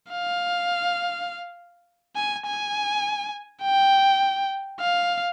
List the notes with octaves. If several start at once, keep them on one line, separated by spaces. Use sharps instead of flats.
F5
G#5
G#5
G5
F5